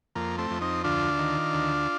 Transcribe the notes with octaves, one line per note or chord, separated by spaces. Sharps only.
F2 A#3
A3 C4
F2
C4 D#4
D2 D4 F4
D#3
D2